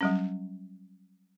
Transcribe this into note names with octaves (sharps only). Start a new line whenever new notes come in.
F#3 G3 C#4